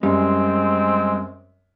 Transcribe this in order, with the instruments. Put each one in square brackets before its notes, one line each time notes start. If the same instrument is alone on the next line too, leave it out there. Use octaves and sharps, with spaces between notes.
[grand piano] F#2 [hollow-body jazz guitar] G3 [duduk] G#3 [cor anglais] C4